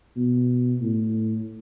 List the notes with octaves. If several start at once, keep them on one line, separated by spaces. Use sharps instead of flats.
B2
A2